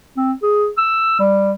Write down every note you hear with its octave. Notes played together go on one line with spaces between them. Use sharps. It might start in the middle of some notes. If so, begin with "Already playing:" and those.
C4
G#4
E6
G3